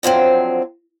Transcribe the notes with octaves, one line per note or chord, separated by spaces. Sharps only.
D3 F3 F#3 C4